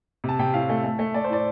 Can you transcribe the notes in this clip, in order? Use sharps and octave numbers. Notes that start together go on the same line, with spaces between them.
C3 A5
C3 G5
A2 F5
A3
A3
A3
A3 D5
C5
A2 D5